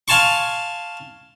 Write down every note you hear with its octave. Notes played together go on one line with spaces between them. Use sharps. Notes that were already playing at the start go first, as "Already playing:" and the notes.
F5 G#5 A5 C6 C#6